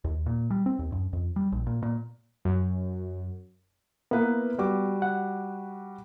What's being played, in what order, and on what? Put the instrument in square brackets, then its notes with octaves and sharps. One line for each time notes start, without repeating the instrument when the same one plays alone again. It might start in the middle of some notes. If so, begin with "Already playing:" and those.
[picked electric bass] D#2
A#2
G3
C4
D#2
F#2
F2
G3
A#1
A#2
A#2
[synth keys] F#2
[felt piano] A#3 E4 B4 [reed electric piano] B3
[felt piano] G3 F#4 D6
[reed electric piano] F#5